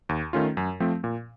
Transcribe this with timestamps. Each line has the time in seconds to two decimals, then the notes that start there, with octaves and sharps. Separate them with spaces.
0.09 D#2
0.33 D#3 A3 C#4 F4
0.57 F#2
0.80 F3 A3 C4
1.04 A#2